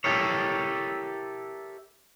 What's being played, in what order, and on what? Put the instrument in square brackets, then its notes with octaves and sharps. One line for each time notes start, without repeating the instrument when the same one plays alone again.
[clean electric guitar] E4 G4 A4 A#4 C#5